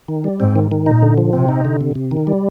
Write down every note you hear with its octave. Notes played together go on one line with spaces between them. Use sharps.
D#3
G3
G#2 C4
D#3
D#3
A#2 D#4
D3
F3
C3 C4
D#4
D3
C3
C3
D#3
G3